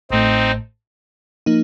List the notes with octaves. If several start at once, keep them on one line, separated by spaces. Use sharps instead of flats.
A1 A2 A3 C4 D#4
F3 A#3 D#4